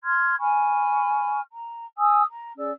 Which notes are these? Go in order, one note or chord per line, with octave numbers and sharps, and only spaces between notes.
C6 F6 G#6
G#5 B5 C#6 F6
A#5
G#5 D#6 E6
A#5
C#4 G#4 D5 E6